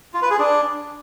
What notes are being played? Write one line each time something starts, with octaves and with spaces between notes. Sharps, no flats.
F4
B4
G#4
D4